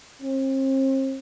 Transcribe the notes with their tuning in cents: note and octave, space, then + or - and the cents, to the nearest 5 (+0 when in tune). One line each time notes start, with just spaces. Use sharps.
C4 +40